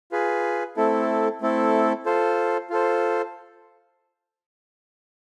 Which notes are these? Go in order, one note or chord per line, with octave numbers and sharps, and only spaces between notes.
F4 G#4 B4
A3 C4 E4 A4
A3 C4 E4 A4
F4 A4 C5
F4 A4 C5